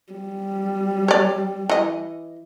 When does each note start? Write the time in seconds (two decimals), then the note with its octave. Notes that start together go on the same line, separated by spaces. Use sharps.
0.13 G3
1.08 C#5 D5
1.69 E3 D#5